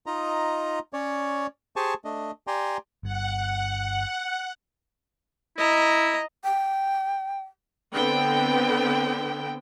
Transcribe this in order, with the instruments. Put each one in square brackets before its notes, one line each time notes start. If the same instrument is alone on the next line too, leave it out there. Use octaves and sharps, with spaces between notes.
[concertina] D#4 F4 D#5 A#5
C#4 C#5 D5
G4 G#4 C5 G#5 A5 C#6
A3 D4 D#5
G4 D5 G5 G#5 A#5 C6
[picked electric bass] G1 G2 [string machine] F#5
[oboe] E4 [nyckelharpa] D#5 A#5
[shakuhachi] G5
[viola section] D3 B3 C4 G5